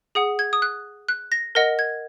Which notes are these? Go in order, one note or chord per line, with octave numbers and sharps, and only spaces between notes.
G#4 F#5 D#6
G#6
D#6
F#6
F#6
A#6
A#4 D#5 F#5 A#6
G#6